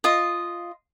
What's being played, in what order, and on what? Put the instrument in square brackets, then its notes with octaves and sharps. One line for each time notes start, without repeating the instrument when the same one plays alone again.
[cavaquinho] F4 D#5